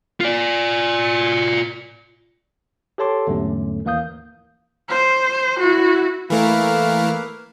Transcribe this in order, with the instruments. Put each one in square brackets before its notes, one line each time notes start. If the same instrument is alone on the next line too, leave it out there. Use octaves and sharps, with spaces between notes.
[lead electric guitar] F4 D5
[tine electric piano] G4 A4 C#5 A5 C6 D6
E2 G#2 D3 F#3 A3 C#4
D#2 E3 A#3 F5 D#6 G6
[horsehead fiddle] C5
E4 F#4
[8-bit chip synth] E3 A3 A#4 [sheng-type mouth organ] A#3 B4 F5